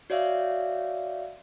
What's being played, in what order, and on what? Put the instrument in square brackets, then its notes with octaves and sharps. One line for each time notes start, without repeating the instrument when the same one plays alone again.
[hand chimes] F#4 C#5 D5 E5 F5